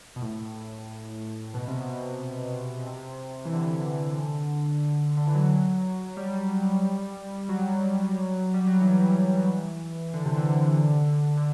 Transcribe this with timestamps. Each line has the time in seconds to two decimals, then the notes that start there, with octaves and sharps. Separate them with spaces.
0.16 B2
0.22 A2
1.54 B2
1.68 C3
1.81 B2
2.86 C3
3.45 E3
3.53 D3
5.17 D3
5.27 E3
5.34 F#3
6.17 G3
7.49 F#3
8.54 G3
8.67 F#3
8.81 E3
10.14 D3
10.25 C3
10.37 D3
11.37 D3